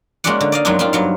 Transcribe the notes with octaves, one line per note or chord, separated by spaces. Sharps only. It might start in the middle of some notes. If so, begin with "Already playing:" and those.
G#3 A#3 C#4 F#4 D5 F#5
D3
D5 D#5 F5
F#2 F#3 G#3 C4 D4 D#4
F#2 C4 F4
G2 F#3 F5